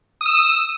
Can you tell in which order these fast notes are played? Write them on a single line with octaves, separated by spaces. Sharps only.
D#6 E6 E7